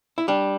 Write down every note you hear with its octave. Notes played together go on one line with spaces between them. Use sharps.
E4
G3 D4